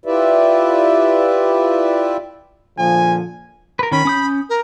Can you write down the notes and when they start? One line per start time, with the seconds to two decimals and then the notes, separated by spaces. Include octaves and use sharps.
0.06 E4 F4 G4 B4 D5 E5
2.78 A#2 D3 F3 G#5
3.79 A#4 B4
3.92 D#3 C#4 B5
4.05 C#4 D#6 G6
4.49 A#4